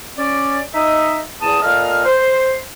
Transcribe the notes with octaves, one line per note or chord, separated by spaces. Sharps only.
C#4 D5
D#4 D#5 E5
E2 A5 D#6
A#2 A4 D#5 F5 F6
C5